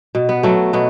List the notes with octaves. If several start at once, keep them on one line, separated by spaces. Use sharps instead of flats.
B2
B3
F#3 A3
B2 B3